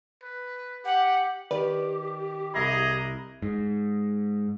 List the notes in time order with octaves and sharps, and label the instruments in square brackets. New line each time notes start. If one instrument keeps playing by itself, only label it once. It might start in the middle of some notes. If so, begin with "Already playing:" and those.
[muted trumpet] B4
[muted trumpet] G4 [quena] F#5
[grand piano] D#3 [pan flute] G4 [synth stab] B4 D5
[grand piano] C2 E4 B5 [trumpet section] G#4 D#5 A#5
[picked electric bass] G#2